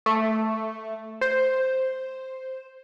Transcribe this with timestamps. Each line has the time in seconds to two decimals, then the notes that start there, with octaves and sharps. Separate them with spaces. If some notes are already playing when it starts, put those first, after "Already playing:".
0.06 A3
1.21 C5